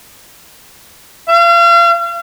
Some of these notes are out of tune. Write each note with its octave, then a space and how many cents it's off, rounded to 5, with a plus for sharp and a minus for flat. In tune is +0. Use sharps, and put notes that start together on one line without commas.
F5 -40